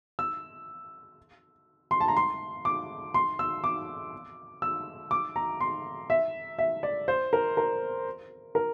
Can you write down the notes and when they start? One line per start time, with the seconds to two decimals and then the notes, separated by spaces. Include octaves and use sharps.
0.19 E6
1.91 C6
2.01 A5
2.08 A#5
2.17 C6
2.65 D6
3.14 C6
3.39 E6
3.64 D6
4.62 E6
5.11 D6
5.36 A#5
5.60 C6
6.10 E5
6.59 E5
6.83 D5
7.08 C5
7.33 A#4
7.57 A#4
8.55 A#4